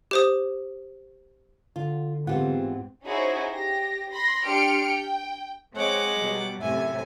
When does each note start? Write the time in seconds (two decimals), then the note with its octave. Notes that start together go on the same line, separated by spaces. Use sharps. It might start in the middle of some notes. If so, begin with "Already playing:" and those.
0.11 G4 C5 D#6
1.76 D3 F4
2.27 G#2 E3 B3 C4 F4 G4 F#5
3.05 C#4 D#4 E4 F#4 G#4 C5
3.52 G4 A#6
4.12 B5 C6 A#6
4.45 D4 G4 C6 F6 C#7 D7
4.87 G5
5.75 G#3 C4 C#5 F#5 D6
6.18 B2 F#3 G3
6.61 F#2 A2 C3 E5 G#5